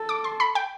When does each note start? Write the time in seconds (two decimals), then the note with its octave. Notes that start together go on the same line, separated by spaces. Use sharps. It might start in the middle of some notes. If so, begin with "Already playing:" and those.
Already playing: A4
0.09 D6
0.24 C6
0.40 B5
0.55 G5